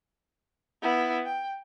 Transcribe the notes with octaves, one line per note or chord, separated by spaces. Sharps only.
B3 E4
G5